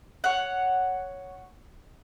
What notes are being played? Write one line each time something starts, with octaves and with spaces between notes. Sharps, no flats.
C#5 F#5